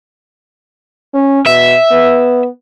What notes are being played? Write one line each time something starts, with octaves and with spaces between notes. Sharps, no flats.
C#4
B2 E5
B3